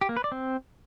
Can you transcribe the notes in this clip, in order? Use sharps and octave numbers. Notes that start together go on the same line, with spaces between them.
G4
A#3
B4
D5
C4